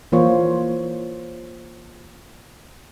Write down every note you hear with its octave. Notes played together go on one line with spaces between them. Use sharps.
E3 A#3 F4 C5 C#5